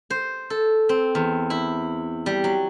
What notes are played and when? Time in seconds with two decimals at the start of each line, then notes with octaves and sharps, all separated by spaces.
0.10 C5
0.50 A4
0.89 C4
1.15 E2
1.50 E4
2.26 G3
2.44 F#3